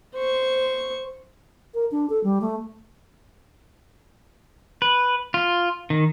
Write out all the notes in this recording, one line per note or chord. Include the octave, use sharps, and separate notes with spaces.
C5 C#6
A#4
D4
A4
G3
A3
B4
F4
D#3